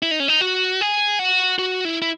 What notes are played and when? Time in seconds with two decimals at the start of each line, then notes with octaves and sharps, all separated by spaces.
0.02 E4
0.11 D#4
0.20 C#4
0.28 D#4
0.41 F#4
0.81 G#4
1.19 F#4
1.59 F#4
1.85 E4
2.02 E4